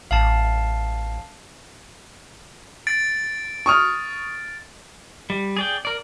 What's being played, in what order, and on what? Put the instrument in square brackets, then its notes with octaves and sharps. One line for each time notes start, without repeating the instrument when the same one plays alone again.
[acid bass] A1 [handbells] F5 A5
[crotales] A6 D7
[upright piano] C#6 D#6 F6
[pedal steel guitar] G3
G#4 D5 G5
A#4 D5